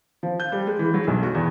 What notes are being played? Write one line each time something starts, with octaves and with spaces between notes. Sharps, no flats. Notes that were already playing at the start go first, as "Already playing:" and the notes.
F3
G6
G3
G#3
E3
F#3
B1
F#4
E2